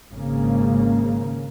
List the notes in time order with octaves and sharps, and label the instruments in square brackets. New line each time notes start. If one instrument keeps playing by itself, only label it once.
[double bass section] G#1 C#3 A#3